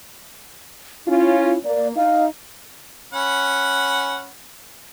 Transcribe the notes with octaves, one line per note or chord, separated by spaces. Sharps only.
C#4 E4 F4
A#3 D5
D#4 F5
C#4 F#5 B5